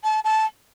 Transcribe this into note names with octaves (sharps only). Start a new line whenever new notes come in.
A5
A5